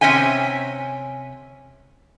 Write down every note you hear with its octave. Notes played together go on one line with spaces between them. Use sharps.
C3 C#4 E5 G5 G#5